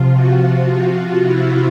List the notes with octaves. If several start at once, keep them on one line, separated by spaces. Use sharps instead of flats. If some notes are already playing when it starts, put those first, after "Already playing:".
Already playing: C3 F3 F4
F#4
F4
E4